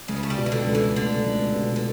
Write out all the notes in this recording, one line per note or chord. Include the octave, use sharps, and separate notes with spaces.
C#2 C#3
B3
A3
G3
B2
E3
D3
C#2
E3
D3 A3
C#2
B2
D3